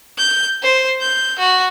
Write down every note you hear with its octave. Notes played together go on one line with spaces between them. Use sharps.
G6
C5
G6
F#4